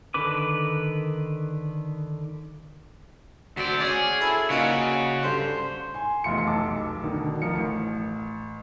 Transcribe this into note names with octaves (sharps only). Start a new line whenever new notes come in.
D3 D#3 B4 D6
D2 C4 F#4 D5
C#4 G#4 D5 F#5
E4 A4 C5 G#5
A#2 C#3 D#4 F4 F#4
G2 D3 C5
G#5 C6
F1 E2 F4 C6 C#7
F1 B1 A5 D6 E6
B2 D3 D#3
D2 F3 A#4 C#7
A1